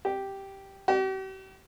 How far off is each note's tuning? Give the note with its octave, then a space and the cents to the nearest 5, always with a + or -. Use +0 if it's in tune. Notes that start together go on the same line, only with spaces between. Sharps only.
G4 -5
G4 -45